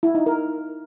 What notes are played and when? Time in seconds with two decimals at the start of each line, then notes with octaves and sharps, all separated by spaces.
0.03 E4
0.15 D#4
0.26 A#4